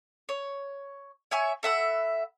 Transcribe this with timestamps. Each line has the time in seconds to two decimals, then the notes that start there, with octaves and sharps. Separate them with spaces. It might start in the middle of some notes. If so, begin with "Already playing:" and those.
0.29 C#5
1.31 C#5 E5 G#5 C#6
1.63 A4 E5 F#5 B5